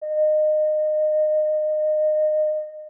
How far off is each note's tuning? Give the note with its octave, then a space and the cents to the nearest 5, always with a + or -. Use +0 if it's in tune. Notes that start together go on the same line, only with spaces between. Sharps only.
D#5 -25